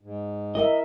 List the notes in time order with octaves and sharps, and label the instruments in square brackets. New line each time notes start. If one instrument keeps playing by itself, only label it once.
[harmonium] G#2
[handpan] E4 A#4 E5 [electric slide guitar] D#5